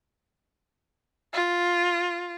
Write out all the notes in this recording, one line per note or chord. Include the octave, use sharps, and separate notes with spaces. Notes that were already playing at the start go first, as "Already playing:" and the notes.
F4